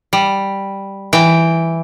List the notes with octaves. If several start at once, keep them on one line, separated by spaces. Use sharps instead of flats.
G3
E3 G5